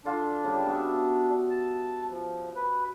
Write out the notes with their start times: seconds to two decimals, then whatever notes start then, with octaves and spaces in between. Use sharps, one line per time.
0.05 D3 D4 F4
0.44 C#3 G3 G4
0.66 B3 F#4 E5
1.50 A5
2.10 F3
2.56 B4